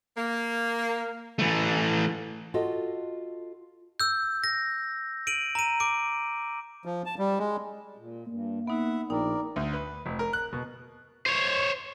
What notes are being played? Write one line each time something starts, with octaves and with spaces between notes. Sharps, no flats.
A#3
E3 A3
F4 F#4 A4 D#5
E6 G6
A#6
D7 D#7 F#7
A#5 D#7
D6 D7
F3
A5
G3
G#3
A#2
G2 A#3
B3 D#4 E5 F#5
A#1 D#4 A#4 D5 G5
D2
B4
F1
A#4
F#6
B2
C5 C#5